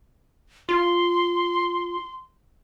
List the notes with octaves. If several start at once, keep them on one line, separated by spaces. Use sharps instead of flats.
F4 C6